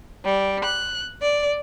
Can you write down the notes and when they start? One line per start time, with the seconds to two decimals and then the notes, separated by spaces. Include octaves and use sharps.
0.25 G3
0.64 F#6
1.22 D5